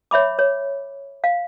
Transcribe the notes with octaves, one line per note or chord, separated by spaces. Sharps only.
C#5 E5 B5 D6
C#5
F5